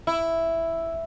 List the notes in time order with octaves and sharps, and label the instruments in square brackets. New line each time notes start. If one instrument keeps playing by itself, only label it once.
[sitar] E4